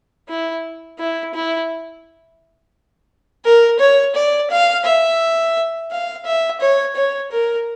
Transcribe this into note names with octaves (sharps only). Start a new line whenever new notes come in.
E4
E4
E4
A#4
C#5
D5
F5
E5
F5
E5
C#5
C#5
A#4